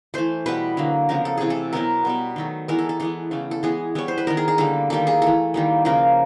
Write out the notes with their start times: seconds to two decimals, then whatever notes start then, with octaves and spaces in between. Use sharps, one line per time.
0.14 E3 A3 C5
0.46 B2 G3 B3 B4
0.77 D3 F#3 A#3
1.09 C#3 F3 G#3 B3 A#4
1.25 A4
1.37 C3 E3 A3 G#4
1.50 A4
1.73 B2 F#3 B3 A#4
2.05 B2 G3 B3
2.36 D#3 F#3 A3
2.68 E3 G#3 B3 A#4
2.78 A4
2.89 A4
3.00 E3 G#3 B3 A4
3.31 C#3 E3 A3
3.51 A4
3.63 E3 G#3 B3 G#4
3.95 E3 G3 B3 C#5
4.08 C5
4.18 B4
4.27 D#3 G#3 B3 A#4
4.37 G#4
4.48 G#4
4.58 D3 G3 A#3 A4
4.90 D#3 G3 A#3 A4
5.07 G#4
5.22 E3 A3 A4
5.54 D#3 G3 A#3
5.85 C#3 F3 A#3 A#4